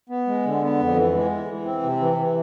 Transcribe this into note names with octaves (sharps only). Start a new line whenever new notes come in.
B3
G#3
D3
B3
F2
E3
G#3
E3
E3
C4
C3
E3
E3